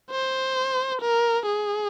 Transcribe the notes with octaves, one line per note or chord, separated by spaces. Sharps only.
C5
A#4
G#4